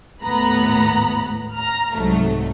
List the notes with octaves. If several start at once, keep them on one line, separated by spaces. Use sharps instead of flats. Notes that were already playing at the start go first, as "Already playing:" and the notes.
D#2 A2 B3 A#5 B5
A#5 F6
C2 G#2 F#3 A3